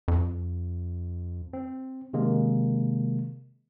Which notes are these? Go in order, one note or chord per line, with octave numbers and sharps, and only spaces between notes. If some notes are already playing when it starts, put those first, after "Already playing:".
F2
C4
C3 D#3 G#3 A#3